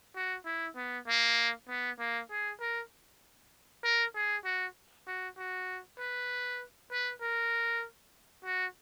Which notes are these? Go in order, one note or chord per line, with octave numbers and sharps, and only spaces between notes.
F#4
E4
B3
A#3
B3
A#3
G#4
A#4
A#4
G#4
F#4
F#4
F#4
B4
B4
A#4
F#4